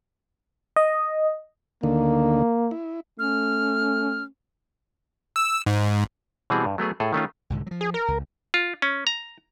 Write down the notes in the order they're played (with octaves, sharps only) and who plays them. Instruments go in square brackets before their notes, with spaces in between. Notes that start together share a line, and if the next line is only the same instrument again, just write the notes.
[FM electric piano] D#5
[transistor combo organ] D2 D3 D#3 [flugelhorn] A#3
[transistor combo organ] E4
[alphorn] A3 [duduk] C#4 [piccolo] F6
[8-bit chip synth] E6
G#2
[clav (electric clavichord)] B2 E3 G3 C4 G#4
G2
F#3 A3 B3 G#4
A2 G#4 A4
D#3 A3 C#4 F4
[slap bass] C2 G#2 D3
F3 F#3
[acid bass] G#4
A#4
[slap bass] C#2
[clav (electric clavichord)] F4
C#4
A#5